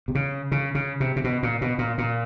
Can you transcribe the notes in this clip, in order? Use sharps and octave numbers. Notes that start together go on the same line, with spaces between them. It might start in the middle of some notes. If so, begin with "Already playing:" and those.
C3
C#3
C#3
C#3
C3
C3
B2
A#2
B2
A#2
A#2